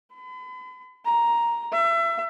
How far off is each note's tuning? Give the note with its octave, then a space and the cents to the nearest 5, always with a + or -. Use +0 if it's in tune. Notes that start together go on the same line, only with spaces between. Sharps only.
B5 +40
A#5 +5
E5 +30